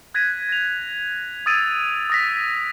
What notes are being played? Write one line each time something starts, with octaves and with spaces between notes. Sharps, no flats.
F#6 G#6 A#6 B6 D#7
A#6 F7
D#6 E6 G#6 A6 D7 D#7
D#6 A#6 B6